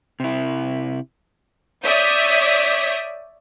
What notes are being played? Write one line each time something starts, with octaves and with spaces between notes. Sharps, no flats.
C3 E4
C#5 D5 E5 D#6 G6 B6